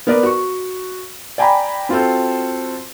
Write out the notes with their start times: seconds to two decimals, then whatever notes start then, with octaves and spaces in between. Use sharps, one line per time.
0.07 B3 A#4 B4 D5
0.23 F#4 C#6
1.38 D5 G5 G#5 A#5 B5
1.89 C4 F4 F#4 A4 C5